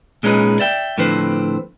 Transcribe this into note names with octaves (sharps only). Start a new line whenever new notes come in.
A#2 G#3 C#4 D#4 B4
D5 E5 G5
A2 D3 F3 C4 B4 C5